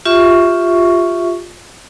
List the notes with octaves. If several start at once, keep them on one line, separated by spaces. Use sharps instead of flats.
F4 G4 E5 C#6